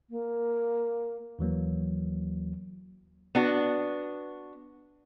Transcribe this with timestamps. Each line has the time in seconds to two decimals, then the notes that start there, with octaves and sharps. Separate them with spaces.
0.10 A#3
1.39 D#2 E3 F#3 A#3
3.35 B3 D4 F#4